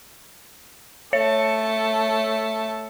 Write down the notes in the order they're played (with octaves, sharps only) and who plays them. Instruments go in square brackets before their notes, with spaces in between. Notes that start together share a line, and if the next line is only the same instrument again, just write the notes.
[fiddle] A3 A5 [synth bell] C#5 C#7